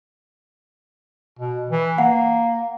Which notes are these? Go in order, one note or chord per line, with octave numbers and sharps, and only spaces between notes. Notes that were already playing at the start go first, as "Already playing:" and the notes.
B2
E3
A#3 F#5